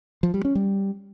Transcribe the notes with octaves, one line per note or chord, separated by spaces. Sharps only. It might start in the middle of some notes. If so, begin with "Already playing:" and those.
F3
G3
C#4
G3